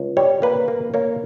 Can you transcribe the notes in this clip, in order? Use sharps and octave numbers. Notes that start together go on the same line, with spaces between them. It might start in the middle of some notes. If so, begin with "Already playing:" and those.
Already playing: C#2
G3 C#5
A#3 B4
A#3
A#3 C#5